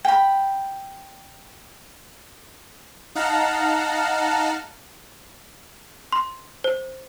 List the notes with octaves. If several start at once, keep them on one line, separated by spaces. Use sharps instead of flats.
G5 B5
D#4 F5 F#5 A5 A#5
C6
C5